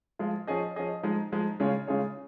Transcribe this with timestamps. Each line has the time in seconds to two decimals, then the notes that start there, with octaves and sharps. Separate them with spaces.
0.19 F3 G#3 F4
0.47 F3 C#4 G#4 D#5
0.76 F3 C#4 G#4 D#5
1.03 F3 G#3 D#4
1.32 F3 G#3 D#4
1.60 C#3 G#3 F4 G#4 C#5
1.87 C#3 G#3 F4 G#4 C#5